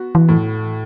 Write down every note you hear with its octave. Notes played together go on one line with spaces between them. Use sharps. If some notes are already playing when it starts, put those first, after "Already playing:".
Already playing: B3 F#4
E3
A2